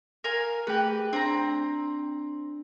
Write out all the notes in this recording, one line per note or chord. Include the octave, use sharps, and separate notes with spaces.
A#4 F5 G#5
A3 G4 G#4 B4
C4 D4 A#5 C6